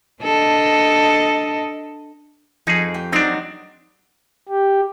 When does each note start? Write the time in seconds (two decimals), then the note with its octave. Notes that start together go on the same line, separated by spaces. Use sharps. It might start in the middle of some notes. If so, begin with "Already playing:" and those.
0.23 D4 A4 D#5
2.67 F2 D#4 G#4
2.94 G4
3.12 F#3 C4 D4 D#4 C6
4.49 G4